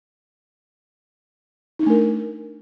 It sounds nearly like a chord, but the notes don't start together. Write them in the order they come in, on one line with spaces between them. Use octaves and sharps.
D#4 D4 A3 A#4